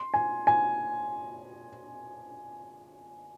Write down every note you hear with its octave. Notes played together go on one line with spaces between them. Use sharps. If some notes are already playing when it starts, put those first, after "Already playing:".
Already playing: C6
G#5
G#5